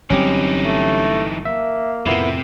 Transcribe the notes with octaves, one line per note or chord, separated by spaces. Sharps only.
G1 E3 F#3 C4 C#4 D#4 G4
A3
A#3 E5
F2 A2 C3 B3 E4 A#4